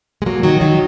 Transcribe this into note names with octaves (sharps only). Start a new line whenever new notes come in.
G#3
F#3 A#3
D#3 F#3
D#3 F#3